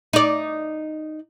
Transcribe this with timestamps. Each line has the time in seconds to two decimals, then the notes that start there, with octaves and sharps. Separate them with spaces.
0.13 D#4 D5